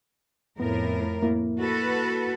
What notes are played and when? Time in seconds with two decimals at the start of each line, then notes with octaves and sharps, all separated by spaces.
0.60 F2 A2 B3 A#4
1.22 A#3 E4
1.60 F#4 A4 B4